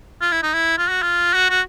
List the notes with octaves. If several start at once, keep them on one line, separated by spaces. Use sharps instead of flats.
F4
E4
D#4
E4
F4
F#4
F4
F#4
F#4